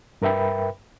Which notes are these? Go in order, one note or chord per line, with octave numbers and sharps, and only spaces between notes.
G2 A#4 B4 E5 G5 B5